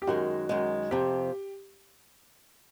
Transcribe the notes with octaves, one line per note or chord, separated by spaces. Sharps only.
G4
F#2 D#3 G#3 F#4
F#2 D#3 G#3
F2 C3 F3 G4